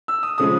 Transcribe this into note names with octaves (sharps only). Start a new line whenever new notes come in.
E6
D#6
C#3 F3 G#3 D#6